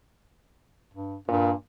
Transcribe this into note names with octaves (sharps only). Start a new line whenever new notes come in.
G2
G2 A#2